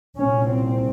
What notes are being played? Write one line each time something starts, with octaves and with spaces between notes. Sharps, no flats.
C2 A#2 C#4
C4